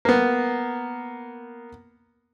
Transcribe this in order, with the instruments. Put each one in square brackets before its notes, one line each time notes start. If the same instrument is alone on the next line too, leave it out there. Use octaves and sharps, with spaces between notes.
[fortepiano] A#3 B3